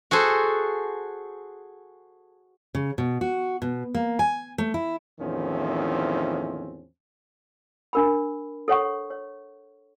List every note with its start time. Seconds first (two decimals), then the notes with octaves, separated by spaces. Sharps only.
0.11 F#4 G#4 A4 C5
2.75 C#3
2.98 B2
3.21 F#4
3.62 B2
3.95 A#3
4.19 G#5
4.58 A3
4.74 E4
5.20 E2 A2 D#3 F3 C4 C#4
7.93 D4 A#4 B5
8.68 A4 C#5 F#5 C#6
9.10 C#5